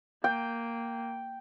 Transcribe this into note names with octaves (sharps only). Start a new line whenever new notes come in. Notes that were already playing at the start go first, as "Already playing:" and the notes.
A#3 G5